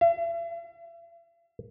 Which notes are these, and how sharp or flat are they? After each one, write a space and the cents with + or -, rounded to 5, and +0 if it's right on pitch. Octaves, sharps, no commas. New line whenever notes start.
E5 +45